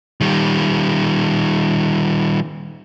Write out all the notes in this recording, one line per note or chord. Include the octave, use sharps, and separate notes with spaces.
D#3 G3